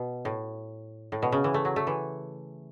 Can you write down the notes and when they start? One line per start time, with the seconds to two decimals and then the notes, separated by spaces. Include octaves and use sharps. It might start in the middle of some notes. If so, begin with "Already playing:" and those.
Already playing: B2
0.25 A2
1.12 A2
1.22 B2
1.32 C#3
1.44 E3
1.54 A3
1.65 F#3
1.76 A3
1.87 E3